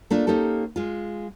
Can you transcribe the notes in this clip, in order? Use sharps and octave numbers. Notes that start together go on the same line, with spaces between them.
A3 A#3 D4 F4
A#3 C#4 D#4 G4 A4
G#3 F4